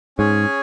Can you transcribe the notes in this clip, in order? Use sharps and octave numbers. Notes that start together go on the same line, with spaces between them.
G#2 C#4 G#4 C#5 G#5